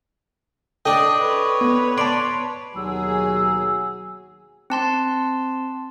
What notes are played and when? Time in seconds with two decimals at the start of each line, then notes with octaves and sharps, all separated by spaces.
0.85 D4 A4 D#5 G5
1.19 B4 C#5
1.61 B3
1.98 D5 A5 C6
2.76 D#2 B2 F#3 G#4 E6
4.70 C4 A5 C6